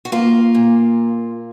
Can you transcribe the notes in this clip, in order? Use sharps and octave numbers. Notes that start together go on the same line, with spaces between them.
F#4
A#3 F4
A#2